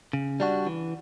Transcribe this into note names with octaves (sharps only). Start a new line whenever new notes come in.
C#3
G3 D4 F#4
E3